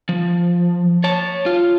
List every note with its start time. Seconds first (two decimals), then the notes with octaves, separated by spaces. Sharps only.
0.09 F3
1.04 C#5 A5
1.46 F4